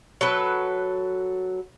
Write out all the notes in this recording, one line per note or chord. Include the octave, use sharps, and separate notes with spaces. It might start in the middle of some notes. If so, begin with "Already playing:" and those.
F#3 A4 B4